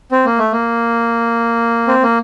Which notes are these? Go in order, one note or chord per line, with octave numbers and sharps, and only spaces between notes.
C4
A#3
A3
A#3
C4
A#3